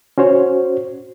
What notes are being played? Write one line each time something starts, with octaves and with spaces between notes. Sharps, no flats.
C#4 F#4 C5 C#5